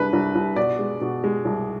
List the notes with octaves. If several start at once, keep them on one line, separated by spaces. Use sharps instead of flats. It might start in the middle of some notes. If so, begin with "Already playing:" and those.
Already playing: C2 G#3 D4 B4
C2
C2
B2 D5
G#3
B2
G#3
C2